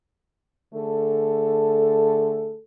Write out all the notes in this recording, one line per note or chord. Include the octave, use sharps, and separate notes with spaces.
D3 A3 G#4 A4